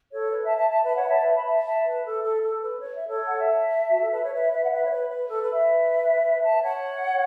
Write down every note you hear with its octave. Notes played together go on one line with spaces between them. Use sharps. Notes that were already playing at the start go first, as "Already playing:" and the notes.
A4 C#5
B4
E5 A5
E5 A5
E5 A5
B4 E5
C#5 F#5
B5
E5 A5
C#5
B4 E5
B5
E5 A5
E5 A5
B4
A4
A4
A4
B4
C#5
E5
A4 C#5
F#5
E5 A5
F#4
A4
B4
C#5
B4 E5
B4 E5
F#5
B4 E5
C#5
B4
B4
A4
B4
B4 E5
E5 A5
C#5 F#5